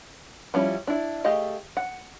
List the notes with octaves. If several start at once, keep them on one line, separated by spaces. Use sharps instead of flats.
F3 G3 C#4 E4
D4 E4
A3 G4 G#4 D#5 F5
F#5